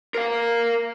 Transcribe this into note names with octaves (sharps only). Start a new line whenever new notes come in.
A#4 F5